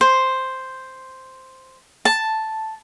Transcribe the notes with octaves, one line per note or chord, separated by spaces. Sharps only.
C5
A5